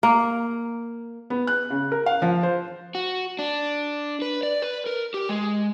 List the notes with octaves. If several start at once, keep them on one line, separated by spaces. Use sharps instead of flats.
A#3
B3
F#6
C#3
A#4
F5
F3
C5
F#4
D4
B4
D5
B4
A#4
G4
G#3